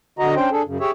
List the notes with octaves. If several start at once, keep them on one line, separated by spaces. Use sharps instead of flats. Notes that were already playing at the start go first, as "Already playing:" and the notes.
D3 F#4 D#5 A#5
C#4 D4 C5 G5
D4 G#4 A4
F#2 C#3
G4 G#4 C#5 E5